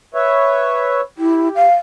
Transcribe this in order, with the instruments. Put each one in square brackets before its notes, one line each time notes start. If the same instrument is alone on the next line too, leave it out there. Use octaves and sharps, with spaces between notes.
[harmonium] B4 C#5 E5
[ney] E4 [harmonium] G4
[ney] F5